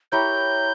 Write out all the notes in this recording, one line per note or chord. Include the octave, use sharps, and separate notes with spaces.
E4 G4 A#4 C#5 G6